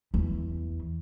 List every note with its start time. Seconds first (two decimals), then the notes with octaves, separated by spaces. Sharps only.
0.14 E2